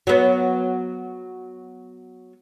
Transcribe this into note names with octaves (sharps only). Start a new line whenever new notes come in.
F#3 B3